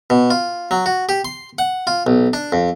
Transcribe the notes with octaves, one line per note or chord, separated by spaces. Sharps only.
B2
F4
F#3
F#4
G4
C6
F#5
F4
B1
D4
F2